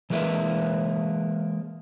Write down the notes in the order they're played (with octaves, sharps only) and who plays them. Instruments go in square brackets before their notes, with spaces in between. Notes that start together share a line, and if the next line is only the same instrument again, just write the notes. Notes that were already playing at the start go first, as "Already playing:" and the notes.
[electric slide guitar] E3 G#3 A#3 B4 E5